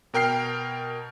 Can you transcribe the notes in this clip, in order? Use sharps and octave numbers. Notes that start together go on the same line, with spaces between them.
B2 A#4 G5 F6 C7